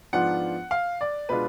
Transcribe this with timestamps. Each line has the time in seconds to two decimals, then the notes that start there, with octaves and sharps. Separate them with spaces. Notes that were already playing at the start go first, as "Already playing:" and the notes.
0.13 G#2 F3 B3 D4 F4 F#5
0.71 F5
1.01 D5
1.29 B2 G#3 D4 F4 B4